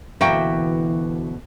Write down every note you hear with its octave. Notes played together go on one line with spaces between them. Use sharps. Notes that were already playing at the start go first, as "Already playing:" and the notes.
D2 B2 E3 A#3 F#4 E5 G5